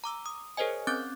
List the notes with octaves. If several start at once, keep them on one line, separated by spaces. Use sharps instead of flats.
A#5 D6 E6
D#6
G#4 A#4 C5 C#5 D#5 G#5
C4 C#4 D6 F#6 G6 A6